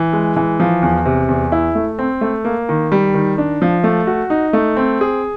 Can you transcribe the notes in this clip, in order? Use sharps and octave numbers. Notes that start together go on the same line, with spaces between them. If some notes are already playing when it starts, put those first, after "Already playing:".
Already playing: E3
G#3
E3
F3
E2
C3
E2
E4
A3
C4
A3
A#3
D#3
G3
D#3
D4
F3
A3
F#4
D#4
A3
C4
G#4